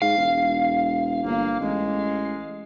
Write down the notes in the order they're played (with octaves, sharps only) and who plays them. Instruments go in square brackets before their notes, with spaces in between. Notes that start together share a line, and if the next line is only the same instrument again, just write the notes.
[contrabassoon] G#2 [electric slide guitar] F5
[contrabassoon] E1
[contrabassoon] G1 [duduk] A#3
[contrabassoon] A1 [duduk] G#3